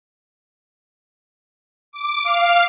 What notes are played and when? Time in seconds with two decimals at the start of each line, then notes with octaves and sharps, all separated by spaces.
1.92 D6
2.23 F5